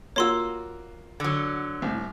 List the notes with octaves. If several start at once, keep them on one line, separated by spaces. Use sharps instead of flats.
A#3 F4 F#4 C#5 C6 E6
D3 F#3
C2 A2